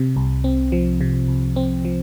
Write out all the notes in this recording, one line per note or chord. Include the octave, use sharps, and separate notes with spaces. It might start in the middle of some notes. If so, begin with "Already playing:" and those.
Already playing: C3
C2
C4
F3
C3
C2
C4
F3